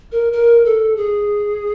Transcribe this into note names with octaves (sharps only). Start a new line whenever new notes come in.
A#4
A#4
A4
G#4